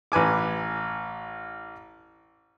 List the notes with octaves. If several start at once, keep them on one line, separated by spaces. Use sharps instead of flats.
A1 B4 G#5 D6